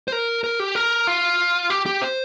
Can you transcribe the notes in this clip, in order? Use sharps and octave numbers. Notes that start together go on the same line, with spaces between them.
C5
A#4
A#4
G4
A#4
F4
G4
G4
C5